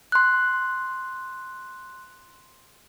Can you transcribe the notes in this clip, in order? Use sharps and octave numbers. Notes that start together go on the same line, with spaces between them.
C6 F#6